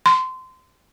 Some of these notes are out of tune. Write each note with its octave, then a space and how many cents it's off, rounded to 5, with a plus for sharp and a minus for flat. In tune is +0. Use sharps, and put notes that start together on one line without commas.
C6 -25